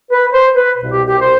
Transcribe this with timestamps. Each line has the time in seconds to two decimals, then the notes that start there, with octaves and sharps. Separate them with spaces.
0.12 B4
0.33 C5
0.55 B4
0.77 C2 B2
0.92 G4
1.06 G4
1.21 C5